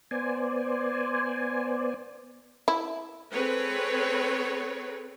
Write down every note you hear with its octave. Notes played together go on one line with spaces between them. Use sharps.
B3 C5 D5 G#5
E4
C4 G#4 A4 B4 C#5